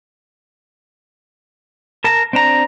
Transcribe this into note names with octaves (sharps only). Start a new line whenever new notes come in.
A#4 A5 A#5
C4 D4 A#5